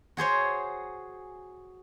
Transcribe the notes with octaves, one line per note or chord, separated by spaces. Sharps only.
F#4 G#4 C5 C#5